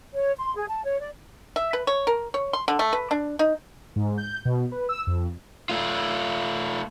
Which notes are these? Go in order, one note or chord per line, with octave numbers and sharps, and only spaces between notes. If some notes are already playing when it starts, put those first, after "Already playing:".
C#5
C6
G#4
A5
C#5
D5
E5
B4
C#5
A#4
C#5
C6
D3
A3
B4
D4
D#4
G#2
G6
B2
B4
E6
F2
A3 F4